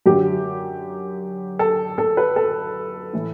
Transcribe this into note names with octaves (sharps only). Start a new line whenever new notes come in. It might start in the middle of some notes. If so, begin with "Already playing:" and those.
F#2 D3 F#3 G4
A4
A4
B4
A4
A2 E3